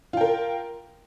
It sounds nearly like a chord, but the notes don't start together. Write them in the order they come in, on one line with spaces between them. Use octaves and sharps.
F4 G5 A#4